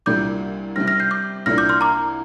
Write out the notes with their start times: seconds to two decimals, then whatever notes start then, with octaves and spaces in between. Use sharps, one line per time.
0.06 C2 A#2 G3 D4 D6 G6
0.76 C3 G3 C4 F6 A#6
0.87 F6 A#6
1.00 G6 C7
1.11 D6 G6
1.46 C2 A#2 A#3 D4 F6 A#6
1.58 D6 G6
1.69 C6 F6
1.81 A#5 D6